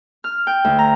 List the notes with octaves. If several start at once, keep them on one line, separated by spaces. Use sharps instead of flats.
F6
G5
D2
A#5